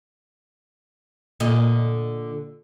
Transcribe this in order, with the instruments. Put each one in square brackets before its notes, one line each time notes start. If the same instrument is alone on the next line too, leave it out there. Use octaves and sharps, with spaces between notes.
[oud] A#2 D3 D#5